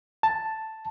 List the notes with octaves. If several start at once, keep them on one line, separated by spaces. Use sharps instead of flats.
A5